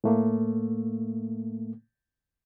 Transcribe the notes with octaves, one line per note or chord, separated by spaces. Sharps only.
A2 A3 A#3